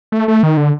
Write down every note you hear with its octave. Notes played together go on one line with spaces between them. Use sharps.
A3
A3
D#3
D3